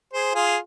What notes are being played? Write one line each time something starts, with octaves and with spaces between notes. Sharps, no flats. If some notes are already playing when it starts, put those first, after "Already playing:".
G#4 C5
F4 G#4